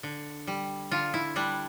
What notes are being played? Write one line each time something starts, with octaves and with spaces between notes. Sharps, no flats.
D3
G3
D3 F4
E4
G3 D4